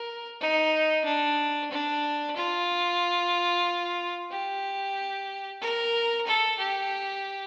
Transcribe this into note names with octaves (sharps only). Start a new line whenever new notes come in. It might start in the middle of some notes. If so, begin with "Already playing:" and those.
Already playing: A#4
D#4
D4
D4
F4
G4
A#4
A4
G4